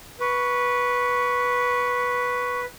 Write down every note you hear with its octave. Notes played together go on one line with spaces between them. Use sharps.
B4 C#6